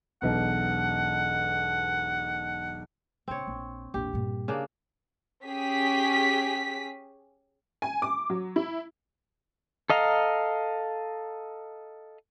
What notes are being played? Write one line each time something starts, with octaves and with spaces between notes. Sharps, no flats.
E1 B1 F#5
A#1 C#3 C4 C#5
A#1
A#1 E2 G4
G2 A#2
C#3 A#3 D4
C#4 G4 G#4 B6
G#5
D6
F#3
E4
A4 D#5 F5 A#5